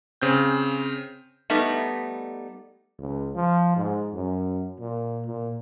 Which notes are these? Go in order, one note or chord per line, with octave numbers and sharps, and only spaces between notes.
C#3 C4 G6
G3 A3 B3 D#4
C#2
F3
G#2
F#2
A#2
A#2